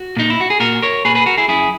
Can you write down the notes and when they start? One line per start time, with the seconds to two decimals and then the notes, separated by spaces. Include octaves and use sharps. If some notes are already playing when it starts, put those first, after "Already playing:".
Already playing: F#4
0.17 A#2 D#4
0.30 E4
0.40 F#4
0.50 G#4
0.60 A#2 F#4 A#4
0.82 A#4 C#5
1.05 A#2 G#4 B4
1.15 G#4 B4
1.26 F#4 A#4
1.38 E4 G#4
1.48 F#2 E4 G#4